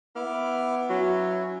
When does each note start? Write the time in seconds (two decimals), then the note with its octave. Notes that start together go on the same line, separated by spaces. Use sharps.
0.16 B3 E4 D6 F6
0.90 F#3 C#4 E4